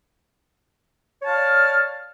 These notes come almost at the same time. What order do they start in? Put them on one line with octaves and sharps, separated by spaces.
C#5 A5 F5 F6 D5